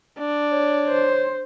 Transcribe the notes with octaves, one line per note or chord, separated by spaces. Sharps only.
D4
C#5
C5